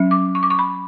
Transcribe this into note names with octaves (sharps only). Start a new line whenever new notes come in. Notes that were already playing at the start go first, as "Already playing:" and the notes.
Already playing: F#3 C#4
D6
C#6
D6
C#6
B5